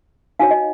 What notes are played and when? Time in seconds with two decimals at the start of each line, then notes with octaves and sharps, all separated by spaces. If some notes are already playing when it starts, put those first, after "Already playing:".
0.39 D#4 F#4 C#5 F5 G#5
0.51 D#5